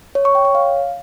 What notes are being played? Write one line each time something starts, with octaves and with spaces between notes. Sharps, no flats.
C#5
C#6
G5
C#5
F5